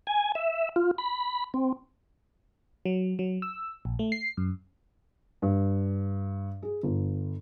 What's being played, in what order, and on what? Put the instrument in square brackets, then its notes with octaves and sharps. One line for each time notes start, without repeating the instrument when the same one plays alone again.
[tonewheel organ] G#5
E5
F4
B5
C4
[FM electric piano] F#3
F#3
E6
A#1
A3
C7
F#2
[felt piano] G2
G#4
G1